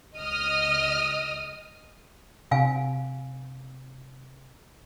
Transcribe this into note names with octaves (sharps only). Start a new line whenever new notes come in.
C#2 D#5 D#6 F6
C3 F5 G#5